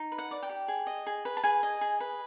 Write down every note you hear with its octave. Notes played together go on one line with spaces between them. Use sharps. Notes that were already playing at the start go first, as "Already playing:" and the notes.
Already playing: D#4
B4
F#5
D5
G5
G4
G#4
D#5
G#4
B4
A5
G#4 G#5
D#5
G#4
B4